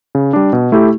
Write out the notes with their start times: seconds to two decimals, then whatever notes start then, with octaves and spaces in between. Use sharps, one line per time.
0.15 C#3
0.33 G3 D4
0.53 B2
0.72 A3 E4 G4